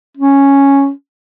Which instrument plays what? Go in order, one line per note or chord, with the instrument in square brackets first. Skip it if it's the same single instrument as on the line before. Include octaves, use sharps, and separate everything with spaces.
[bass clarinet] C#4